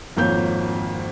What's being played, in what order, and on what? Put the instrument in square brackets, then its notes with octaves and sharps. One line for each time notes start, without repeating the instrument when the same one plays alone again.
[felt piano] G#1 F2 A#3 C#5 G6